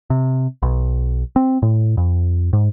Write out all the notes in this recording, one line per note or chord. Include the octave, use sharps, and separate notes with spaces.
C3
B1
C4
A2
F2
G#2